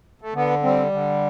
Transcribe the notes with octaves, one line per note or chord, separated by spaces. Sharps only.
A3
D3 B3
G3 C4
D3